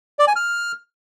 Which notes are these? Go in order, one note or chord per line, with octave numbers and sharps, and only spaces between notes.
D5
G#5
F6